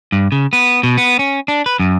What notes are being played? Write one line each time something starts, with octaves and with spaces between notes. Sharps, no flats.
G2
C#3
B3
B2
B3
C#4
D4
B4
F#2